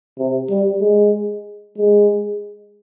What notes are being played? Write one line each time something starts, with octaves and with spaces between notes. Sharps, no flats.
C3
G3
G#3
G#3